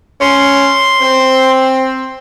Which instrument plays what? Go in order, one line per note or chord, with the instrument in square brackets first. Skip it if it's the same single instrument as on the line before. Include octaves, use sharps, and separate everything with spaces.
[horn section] C#4 [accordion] C6
[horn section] C4